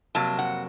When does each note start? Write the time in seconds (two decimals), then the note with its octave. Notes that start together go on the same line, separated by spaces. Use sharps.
0.15 F2 C3 F#3 A#3 A5
0.39 F#5